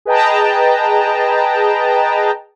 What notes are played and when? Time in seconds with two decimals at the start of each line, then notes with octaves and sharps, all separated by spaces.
0.05 G#4 B4 D#5 G5 A5 A#5